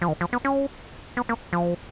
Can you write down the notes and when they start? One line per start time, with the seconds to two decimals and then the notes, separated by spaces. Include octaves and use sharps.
0.02 F3
0.08 D#3
0.21 F3
0.33 B3
0.45 C#4
1.17 B3
1.29 A#3
1.53 F3